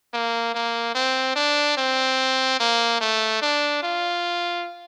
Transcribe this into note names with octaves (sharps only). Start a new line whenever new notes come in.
A#3
A#3
C4
D4
C4
A#3
A3
D4
F4